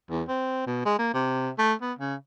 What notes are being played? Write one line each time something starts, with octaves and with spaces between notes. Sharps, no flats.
E2
C4
B2
G#3
A#3
C3
A3
B3
C#3